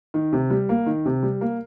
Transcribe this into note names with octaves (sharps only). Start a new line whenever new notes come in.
D#3
C3
G3
A#3
D#3
C3
G3
A#3